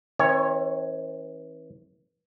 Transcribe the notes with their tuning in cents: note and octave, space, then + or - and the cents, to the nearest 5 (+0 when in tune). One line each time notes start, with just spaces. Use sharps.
E3 -45 C4 +40 C#5 +0